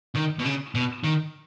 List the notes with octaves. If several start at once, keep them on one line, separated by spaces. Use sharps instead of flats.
D#3
B2
C#3
B2
D#3